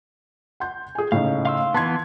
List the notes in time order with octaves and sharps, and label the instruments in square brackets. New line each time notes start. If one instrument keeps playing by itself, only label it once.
[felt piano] F#5 C6 G6
G#4 G#5
[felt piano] A2 C#3 D#4 [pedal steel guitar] F5
[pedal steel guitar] F5 C6 E6
[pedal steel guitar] E3 B3 [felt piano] A5 C6 G#6